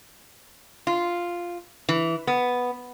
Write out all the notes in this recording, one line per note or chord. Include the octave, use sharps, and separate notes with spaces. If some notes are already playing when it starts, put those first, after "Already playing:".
F4
E3
B3